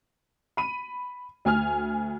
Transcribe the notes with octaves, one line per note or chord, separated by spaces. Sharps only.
B5 D#7
D2 G#5 F6